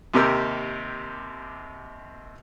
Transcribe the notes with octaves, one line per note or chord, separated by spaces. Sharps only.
D#2 C3 G4 A#4 E6